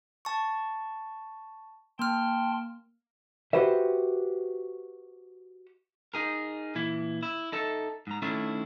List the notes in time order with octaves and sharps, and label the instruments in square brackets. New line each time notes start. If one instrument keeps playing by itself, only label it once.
[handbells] A5 C#6
[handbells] A#3 F6 [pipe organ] G5 A5 C6
[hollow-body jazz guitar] F#4 G4 B4 C5 E5
[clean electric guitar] D#4 G#4 A#4
A#2 E3 E4
E4
D#4 A4 E5
G#2 A#5
D#3 A3 C#4 D4 E4